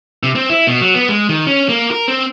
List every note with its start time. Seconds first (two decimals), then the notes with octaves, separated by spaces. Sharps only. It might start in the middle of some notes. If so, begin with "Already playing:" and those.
0.23 C3
0.35 C4
0.50 E4
0.67 B2
0.82 F#3
0.94 B3
1.09 G#3
1.29 D#3
1.47 C#4
1.69 A#3
1.91 A#4
2.08 C4